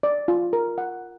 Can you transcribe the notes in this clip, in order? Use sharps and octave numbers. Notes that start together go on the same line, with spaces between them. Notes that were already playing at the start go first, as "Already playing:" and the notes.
D5
F4
A#4
F#5